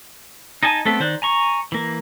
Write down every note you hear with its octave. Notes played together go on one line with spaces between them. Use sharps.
D#4 D#5 G#5 A5
A3 B3 C4 A4 E5
D#3 C5 D5 F#6
G#5 A#5 C#6
E3 A#3